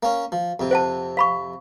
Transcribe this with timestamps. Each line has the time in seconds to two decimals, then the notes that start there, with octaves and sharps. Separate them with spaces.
0.03 A#3 C#4
0.32 F3
0.60 F2 C3
0.71 C5 F#5 A5
1.17 F5 B5 C#6